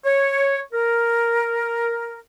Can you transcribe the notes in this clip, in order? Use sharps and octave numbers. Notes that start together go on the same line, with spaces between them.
C#5
A#4